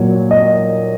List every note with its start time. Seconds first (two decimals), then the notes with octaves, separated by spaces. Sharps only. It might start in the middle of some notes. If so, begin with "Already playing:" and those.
Already playing: A#2 F#3 C#5
0.31 D#5